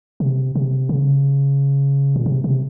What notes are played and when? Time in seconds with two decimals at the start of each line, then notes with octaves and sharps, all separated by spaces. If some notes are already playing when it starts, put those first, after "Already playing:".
0.20 C3
0.55 C3
0.89 C#3
2.16 A#2
2.26 C3
2.44 C3